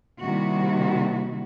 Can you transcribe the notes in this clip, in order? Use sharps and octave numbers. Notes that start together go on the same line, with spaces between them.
C3 D#3 G3 A#3 E4 F#4